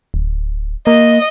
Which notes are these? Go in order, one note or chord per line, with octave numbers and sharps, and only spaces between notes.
D1
A#3 D#5